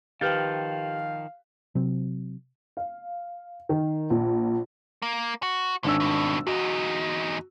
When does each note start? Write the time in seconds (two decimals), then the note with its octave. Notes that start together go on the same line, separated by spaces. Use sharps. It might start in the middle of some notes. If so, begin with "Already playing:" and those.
0.21 D#3 F3 G4 B4 F5 F6 G6 A6
1.75 C3 F#3 C4
2.77 F5
3.69 D#3
4.10 A#1
5.02 A#3
5.43 F#4
5.84 G#1 D3 C#4 D4 E6
6.00 G2 B2
6.47 E2 D#4 F#4